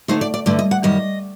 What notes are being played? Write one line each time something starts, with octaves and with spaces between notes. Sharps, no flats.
D3 A3 D#4 C5
D5
D5
G2 D3 A3 D5
D#5
F#5
F#2 D#3 G3 D#5